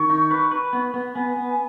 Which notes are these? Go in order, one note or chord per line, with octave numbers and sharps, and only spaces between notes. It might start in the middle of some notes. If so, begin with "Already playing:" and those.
Already playing: D#3 C#6
D#4
B4
B4
B3
B3
B3 G#5
B3